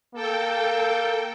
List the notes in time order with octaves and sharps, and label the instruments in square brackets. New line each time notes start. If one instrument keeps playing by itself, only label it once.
[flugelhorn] A#3 [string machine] A4 G5